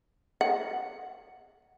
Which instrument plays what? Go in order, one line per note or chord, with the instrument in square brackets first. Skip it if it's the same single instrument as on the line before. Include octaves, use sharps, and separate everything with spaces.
[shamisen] F#5